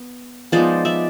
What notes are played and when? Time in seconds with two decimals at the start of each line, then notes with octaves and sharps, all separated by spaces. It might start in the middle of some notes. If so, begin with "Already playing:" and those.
Already playing: B3
0.52 F3 G#3 B3 D#4 C5 D5
0.85 D5 E5